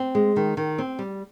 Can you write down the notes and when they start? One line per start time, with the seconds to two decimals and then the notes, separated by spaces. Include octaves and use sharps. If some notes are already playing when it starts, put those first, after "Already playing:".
Already playing: C4
0.15 G#3
0.36 D#3
0.57 D#3
0.78 C4
0.99 G3